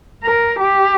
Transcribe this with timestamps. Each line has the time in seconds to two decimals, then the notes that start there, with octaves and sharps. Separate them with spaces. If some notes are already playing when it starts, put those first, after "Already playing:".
0.22 A#4
0.60 G4